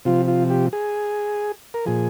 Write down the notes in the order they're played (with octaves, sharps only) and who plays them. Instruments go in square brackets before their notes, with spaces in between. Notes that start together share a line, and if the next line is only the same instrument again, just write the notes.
[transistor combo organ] C3 F3 F4
F4
G4
G#4
A#4
A#2 F3 G#4